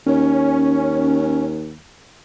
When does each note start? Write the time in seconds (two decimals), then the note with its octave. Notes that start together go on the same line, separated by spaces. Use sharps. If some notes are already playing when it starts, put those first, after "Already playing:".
0.07 D#2 C#4